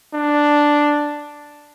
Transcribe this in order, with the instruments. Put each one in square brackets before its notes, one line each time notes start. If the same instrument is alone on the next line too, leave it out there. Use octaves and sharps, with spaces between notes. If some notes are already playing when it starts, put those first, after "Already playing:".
[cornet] D4